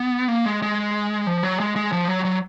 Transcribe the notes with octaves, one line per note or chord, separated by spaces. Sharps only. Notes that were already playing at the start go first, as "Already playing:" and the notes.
Already playing: B3
A#3
G#3
G#3
F3
F#3
G#3
G#3
F3
F#3
F#3